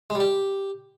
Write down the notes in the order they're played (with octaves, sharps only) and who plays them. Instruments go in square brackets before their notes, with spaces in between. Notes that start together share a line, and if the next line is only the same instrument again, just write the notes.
[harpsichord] G#3
G3
G4